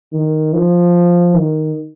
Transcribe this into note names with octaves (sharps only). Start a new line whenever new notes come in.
D#3
F3
D#3